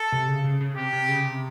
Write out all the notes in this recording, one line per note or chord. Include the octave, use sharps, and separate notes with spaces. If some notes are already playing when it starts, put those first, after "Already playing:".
Already playing: A4
C3
C#3
C#3
C#3
C3 G4
C3
C#3
C3